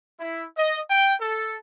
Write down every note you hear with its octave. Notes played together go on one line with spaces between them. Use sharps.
E4
D#5
G5
A4